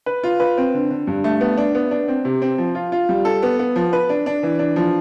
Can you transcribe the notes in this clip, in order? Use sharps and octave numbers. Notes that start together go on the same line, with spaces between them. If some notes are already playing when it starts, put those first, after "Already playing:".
B4
F4
B4
C4
D3
D3
G2
A3
B3
D4
B3
D4
C4
C3
C4
F3
F4
F4
G3
A4
B3
B3
F3
B4
D4
D4
E3
D4
F3